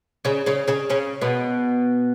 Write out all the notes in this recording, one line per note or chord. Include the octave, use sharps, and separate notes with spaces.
C#3 C#4
C#3 C#4
C#3 C#4
C#3 C#4
B2 B3